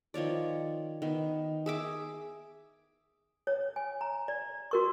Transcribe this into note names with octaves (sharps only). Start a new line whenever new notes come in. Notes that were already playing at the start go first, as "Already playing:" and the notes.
D#3 F3 C#5 D5
D#3 B3
G#4 E5 D6
C#5
G#5
A#5
D5
F#4 A#4 C#6